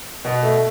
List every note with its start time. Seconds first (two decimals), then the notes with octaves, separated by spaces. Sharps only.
0.25 B2
0.43 A3